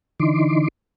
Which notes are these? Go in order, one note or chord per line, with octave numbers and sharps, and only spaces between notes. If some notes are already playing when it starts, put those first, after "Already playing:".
D3 E3 D#4 C6 D6